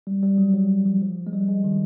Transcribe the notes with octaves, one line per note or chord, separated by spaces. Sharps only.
G3
G3
F#3
F#3
F3
F3
G#3
G3
G#3
D#3